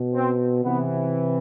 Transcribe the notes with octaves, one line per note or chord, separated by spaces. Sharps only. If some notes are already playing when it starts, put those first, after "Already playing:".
Already playing: B2
C4
C3 E3 B3